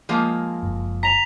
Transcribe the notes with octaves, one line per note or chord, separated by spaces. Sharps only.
F3 G#3 A#3
F#1
A#5 B6 F7